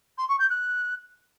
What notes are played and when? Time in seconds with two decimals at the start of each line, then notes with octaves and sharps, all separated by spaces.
0.18 C6
0.28 C#6
0.39 G6
0.50 F#6